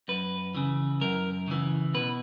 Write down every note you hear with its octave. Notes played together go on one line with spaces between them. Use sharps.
F#2 B4
C#3 E3
F#2 A#4
C#3 E3
B2 B4